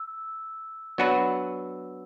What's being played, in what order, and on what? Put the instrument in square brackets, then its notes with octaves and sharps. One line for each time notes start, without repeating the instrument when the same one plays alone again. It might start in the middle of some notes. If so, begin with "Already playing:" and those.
Already playing: [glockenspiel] E6
[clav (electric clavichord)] F#3 B3 D4 F#4 B4